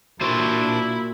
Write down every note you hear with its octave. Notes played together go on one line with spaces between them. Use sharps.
A#2 D4 E4 F#4 C5 C6